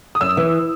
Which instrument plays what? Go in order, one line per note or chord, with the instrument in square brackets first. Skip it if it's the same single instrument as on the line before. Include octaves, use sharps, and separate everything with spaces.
[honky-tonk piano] D#6
[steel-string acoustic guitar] F#2 [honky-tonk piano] E6
[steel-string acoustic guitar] E3